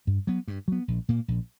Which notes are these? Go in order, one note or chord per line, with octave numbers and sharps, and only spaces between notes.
G2
F#3 B3
G2
F#3 B3
A#1
A#2 A#3
A#1